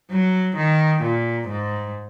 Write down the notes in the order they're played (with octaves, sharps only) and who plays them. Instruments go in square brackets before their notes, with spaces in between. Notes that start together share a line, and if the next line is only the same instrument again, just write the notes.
[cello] F#3
D#3
A#2
G#2